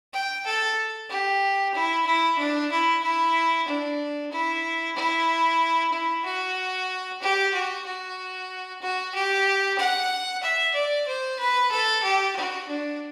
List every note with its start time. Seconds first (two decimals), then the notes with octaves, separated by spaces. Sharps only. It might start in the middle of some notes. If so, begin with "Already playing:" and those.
0.13 G5
0.46 A4
1.09 G4
1.74 E4
2.06 E4
2.38 D4
2.71 E4
3.03 E4
3.68 D4
4.32 E4
4.96 E4
5.92 E4
6.25 F#4
7.21 G4
7.53 F#4
7.86 F#4
8.81 F#4
9.14 G4
9.78 F#5
10.43 E5
10.74 D5
11.07 C5
11.39 B4
11.71 A4
12.03 G4
12.35 F#4
12.68 D4